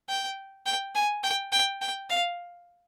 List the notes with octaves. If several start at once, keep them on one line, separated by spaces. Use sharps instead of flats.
G5
G5
G#5
G5
G5
G5
F5